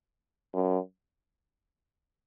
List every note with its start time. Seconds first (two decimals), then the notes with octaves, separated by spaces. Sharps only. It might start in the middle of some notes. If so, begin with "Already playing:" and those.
0.54 F#2